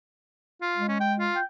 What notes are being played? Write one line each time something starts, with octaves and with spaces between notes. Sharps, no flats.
F4
G#3
C#4
G5
F4
G5